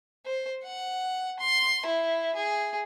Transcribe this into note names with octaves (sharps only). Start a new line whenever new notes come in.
C5
F#5
C6
E4
G#4